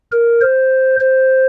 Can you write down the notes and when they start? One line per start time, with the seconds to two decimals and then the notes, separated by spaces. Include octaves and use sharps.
0.12 A#4
0.41 C5
1.00 C5